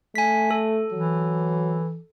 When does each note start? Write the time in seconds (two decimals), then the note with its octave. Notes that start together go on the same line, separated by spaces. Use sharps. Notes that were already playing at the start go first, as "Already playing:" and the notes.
0.15 A3 G#5 B6
0.51 A4
0.92 E3 F#3